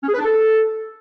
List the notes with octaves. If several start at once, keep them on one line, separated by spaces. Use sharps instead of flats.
C#4
G#4
B4
D4
A4